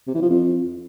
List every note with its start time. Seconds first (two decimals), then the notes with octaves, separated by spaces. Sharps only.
0.07 C3
0.15 E3
0.22 F3
0.29 F2